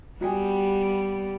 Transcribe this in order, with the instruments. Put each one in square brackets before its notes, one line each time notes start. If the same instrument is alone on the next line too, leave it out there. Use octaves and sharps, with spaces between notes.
[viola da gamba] G3 B3 [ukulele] F#4 G#4 G5